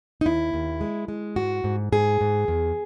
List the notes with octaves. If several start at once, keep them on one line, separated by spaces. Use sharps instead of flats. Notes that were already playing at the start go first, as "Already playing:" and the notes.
D#4
D#2 E4
D#2
G#3
G#3
G#2 F#4
G#2
G#2 G#4
G#2
E2